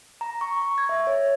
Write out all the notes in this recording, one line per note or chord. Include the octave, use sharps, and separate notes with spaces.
A#5
C#6
C#6
G#6
E5
C#5